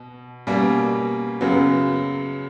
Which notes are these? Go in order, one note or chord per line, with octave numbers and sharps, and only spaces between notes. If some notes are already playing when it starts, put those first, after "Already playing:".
Already playing: B2
B2 G3 A#3 C#4
F#2 C#3 F#3 B3